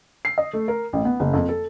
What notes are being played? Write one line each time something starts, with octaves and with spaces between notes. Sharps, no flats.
C7
D#5
A3
A#4
A1
B3
F#1
F2
A4